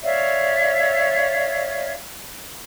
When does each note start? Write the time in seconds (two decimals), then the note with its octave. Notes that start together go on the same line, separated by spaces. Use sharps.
0.02 C#5 D5 E5 F5